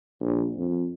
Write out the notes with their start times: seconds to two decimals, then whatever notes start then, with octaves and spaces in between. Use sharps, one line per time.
0.20 A#1
0.57 F2